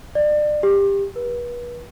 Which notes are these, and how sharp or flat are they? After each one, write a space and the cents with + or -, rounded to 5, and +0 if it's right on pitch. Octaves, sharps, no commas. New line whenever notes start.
D5 +30
G4 +20
B4 -35